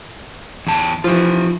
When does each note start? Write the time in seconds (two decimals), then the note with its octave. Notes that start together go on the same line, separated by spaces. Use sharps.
0.67 E2 A5
1.04 E3 F3 F4 G4